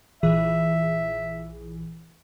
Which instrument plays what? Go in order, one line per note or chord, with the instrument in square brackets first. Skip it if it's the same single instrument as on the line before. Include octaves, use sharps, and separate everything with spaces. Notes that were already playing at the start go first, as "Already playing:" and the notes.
[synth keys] A#1 E3 G#4 [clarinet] E5